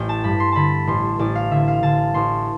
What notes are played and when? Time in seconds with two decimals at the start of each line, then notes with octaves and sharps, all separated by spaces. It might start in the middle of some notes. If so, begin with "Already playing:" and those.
Already playing: A1 G5
0.09 A5
0.24 G2 B5
0.40 C6
0.52 D3 A5 B5
0.87 A1 C6
1.19 A1 D5
1.35 F5
1.51 D3 E5
1.68 F5
1.83 D3 A5
2.14 A1 C6